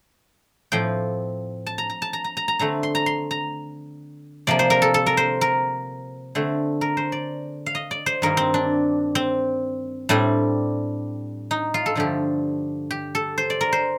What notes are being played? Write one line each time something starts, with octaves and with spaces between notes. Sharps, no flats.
A2 F3 C4 G5
A5
A#5
A#5
A5
A#5
A#5
A#5
A#5
D3 A3 C4 A#5
C6
A#5
C6
A#5
C3 F3 A#3 D5
C5
A#4
A4
A4
A#4
C5
A#4
D3 A3 C4
A#4
C5
D5
F5
D#5
D5
C5
G2 D#3 A#3 A#4
C4
D4
C4
A2 G3 C4 D4
D#4
F4
A4
G2 D3 F3 A3 G4
G4
A4
C5
D5
A#4
C5